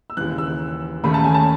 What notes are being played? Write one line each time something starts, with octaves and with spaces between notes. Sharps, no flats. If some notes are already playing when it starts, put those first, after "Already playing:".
E6
D#2 C#3 E3 F#6
E6
D#2 D#3 A3 C#4 B5
A5
G#5
A5